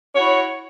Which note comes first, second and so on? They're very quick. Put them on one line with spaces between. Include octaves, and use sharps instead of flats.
C#5 F#4 E4